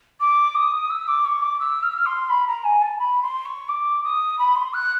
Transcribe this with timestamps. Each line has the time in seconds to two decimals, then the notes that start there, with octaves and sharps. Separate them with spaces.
0.20 D6
0.54 D#6
0.90 E6
1.07 D6
1.25 C#6
1.42 D6
1.59 E6
1.82 F6
1.90 E6
1.97 F6
2.05 C6
2.29 B5
2.46 A#5
2.64 G#5
2.81 A5
2.99 B5
3.22 C6
3.45 C#6
3.68 D6
4.03 D#6
4.38 B5
4.55 C6
4.73 F#6